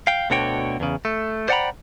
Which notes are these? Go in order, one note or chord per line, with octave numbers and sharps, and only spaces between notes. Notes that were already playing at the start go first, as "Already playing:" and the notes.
F5 G5
D2 B2 D3 F#4 C#5 G5
E2 C#3
A3
C5 D5 F#5 G5 A#5 B5